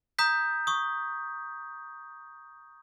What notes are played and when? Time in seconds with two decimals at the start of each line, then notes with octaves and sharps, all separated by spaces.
0.19 A#5 D#6 G6 B6
0.67 C#6 D#6